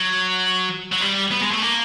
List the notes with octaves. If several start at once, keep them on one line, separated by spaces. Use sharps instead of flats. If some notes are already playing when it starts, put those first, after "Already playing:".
Already playing: F#3
F#3
G3
B3
G#3
A3
A#3